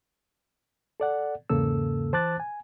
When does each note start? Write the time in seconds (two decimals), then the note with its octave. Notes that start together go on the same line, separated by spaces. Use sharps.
1.00 A4 D5 F#5
1.49 E2 G#2 C#3 A#3 A4 E6
2.13 E3 C5 A5 D6 F#6 A6
2.40 G#5